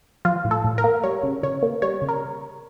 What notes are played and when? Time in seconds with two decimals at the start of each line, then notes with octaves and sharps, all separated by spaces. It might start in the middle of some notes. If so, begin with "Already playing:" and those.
0.25 F3 F4
0.45 A2
0.51 A4
0.64 A2
0.78 A#4
0.84 A#3
1.03 G3 C#5
1.23 C#3
1.43 C#3 C#5
1.63 A#3
1.82 G3 C#5
2.02 C#3
2.09 A#4